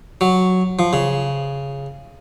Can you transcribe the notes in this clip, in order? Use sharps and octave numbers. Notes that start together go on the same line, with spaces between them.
F#3
F3
C#3